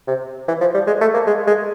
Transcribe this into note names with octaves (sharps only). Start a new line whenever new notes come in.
C3
E3
F3
G3
G#3
A3
A#3
G#3
G#3